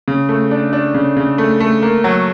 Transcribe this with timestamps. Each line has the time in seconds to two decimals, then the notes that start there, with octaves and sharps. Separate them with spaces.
0.08 C#3
0.29 A3
0.51 D4
0.73 D4
0.94 C#3
1.17 C#3
1.38 A3
1.60 A3
1.83 A#3
2.04 F#3